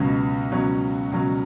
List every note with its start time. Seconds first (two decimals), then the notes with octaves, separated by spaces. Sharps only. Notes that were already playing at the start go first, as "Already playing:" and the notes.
Already playing: C#2 B2 F#3 C#4
0.52 C#2 B2 F#3 C#4
1.12 C#2 B2 F#3 C#4